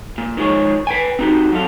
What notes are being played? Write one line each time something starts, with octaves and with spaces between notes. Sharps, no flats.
A#2
D#3 F3 G#3 G#4 C#5
B4 G5 G#5
C4 D#4 F#4 G4
F#3 C4 A4 F5